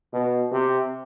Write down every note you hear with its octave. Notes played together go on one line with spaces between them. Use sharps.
B2
C3